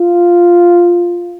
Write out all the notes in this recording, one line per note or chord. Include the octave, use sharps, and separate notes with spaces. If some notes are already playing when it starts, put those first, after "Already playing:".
Already playing: F4